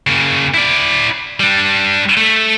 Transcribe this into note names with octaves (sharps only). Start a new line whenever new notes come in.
C#3 A#3
E4 D5
G3 D4
A3